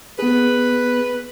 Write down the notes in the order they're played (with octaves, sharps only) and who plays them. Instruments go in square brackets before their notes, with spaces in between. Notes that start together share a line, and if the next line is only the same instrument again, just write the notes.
[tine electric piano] B3 G#4 [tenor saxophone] B4